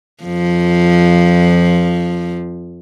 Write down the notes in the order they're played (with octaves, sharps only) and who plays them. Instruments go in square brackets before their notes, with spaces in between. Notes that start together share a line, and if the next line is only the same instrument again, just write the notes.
[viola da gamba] F2 F3